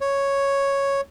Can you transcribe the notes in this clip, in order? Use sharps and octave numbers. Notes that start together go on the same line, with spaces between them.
C#5